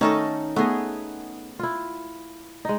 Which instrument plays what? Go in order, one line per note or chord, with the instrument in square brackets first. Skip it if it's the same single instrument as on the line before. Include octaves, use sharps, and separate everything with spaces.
[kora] D#3 A3 C#4 [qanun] D#4 A4 D#5
[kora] A3 D#5 [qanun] B3 G#4
[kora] E4 F4
G#3 D#4